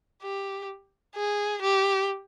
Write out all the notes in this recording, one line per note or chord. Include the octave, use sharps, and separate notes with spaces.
G4
G#4
G4